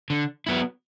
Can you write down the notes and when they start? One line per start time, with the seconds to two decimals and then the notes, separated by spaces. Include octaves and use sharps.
0.10 D3
0.47 F#3 B3 E4